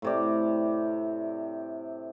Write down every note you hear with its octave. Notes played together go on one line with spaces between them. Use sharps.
A2 C3 D5